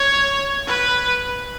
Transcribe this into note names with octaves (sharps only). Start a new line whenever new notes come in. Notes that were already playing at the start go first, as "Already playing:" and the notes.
Already playing: C#5
B4